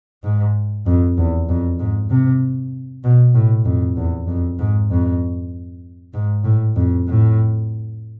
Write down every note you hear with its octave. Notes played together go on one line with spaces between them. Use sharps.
G#2
F2
E2
F2
G#2
C3
B2
A2
F2
E2
F2
G#2
F2
G#2
A2
F2
A2